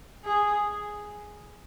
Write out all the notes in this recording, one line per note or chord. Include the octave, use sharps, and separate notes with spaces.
G#4